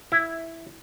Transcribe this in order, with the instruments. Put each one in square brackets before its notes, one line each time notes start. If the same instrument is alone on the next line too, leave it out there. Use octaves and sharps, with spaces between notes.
[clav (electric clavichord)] E4